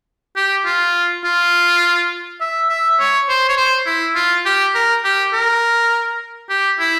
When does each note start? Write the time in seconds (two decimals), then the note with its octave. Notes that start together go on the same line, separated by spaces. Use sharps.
0.36 G4
0.65 F4
1.24 F4
2.41 E5
2.69 E5
3.00 C#5
3.29 C5
3.49 C#5
3.57 C5
3.86 E4
4.15 F4
4.46 G4
4.75 A#4
5.04 G4
5.33 A#4
6.49 G4
6.79 E4